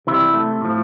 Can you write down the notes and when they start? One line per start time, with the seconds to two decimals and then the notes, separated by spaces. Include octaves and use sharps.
0.07 C3 E3 G3 E4
0.34 A3
0.61 A2 F3